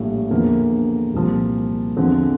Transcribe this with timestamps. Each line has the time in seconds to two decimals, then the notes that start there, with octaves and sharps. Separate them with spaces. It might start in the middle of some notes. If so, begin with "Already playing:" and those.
Already playing: A#1 A2 G3
0.30 E2 D3 F3 A#3
1.13 C2 A#2 F3
1.97 E2 D3 F3 C4